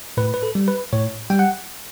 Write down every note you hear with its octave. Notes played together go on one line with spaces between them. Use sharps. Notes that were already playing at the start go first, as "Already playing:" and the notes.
A2 B4
B4
A4
G3
B4
A2 C#5
G3 G5
F#5